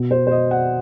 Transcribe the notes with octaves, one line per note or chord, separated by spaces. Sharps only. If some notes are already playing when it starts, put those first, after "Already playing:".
Already playing: B2
C5
C5
D#5
F#5